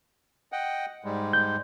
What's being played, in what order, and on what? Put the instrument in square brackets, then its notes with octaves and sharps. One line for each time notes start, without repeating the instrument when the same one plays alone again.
[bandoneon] D#5 F#5 G5
G#2 G3 G#3
[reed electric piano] G6